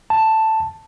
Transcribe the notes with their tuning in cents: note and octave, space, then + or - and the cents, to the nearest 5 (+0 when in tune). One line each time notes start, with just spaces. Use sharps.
A5 +5